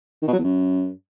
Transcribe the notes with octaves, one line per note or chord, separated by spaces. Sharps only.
D#3
B2
F#3
E2
F#2